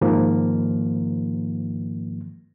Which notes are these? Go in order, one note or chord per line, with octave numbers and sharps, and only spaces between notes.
G#2 D#3 F3 A#3